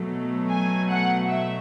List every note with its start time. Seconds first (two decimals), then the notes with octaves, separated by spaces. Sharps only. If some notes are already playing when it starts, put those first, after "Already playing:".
Already playing: B2 F#3 A3
0.50 G#5
0.90 F#5
1.29 E5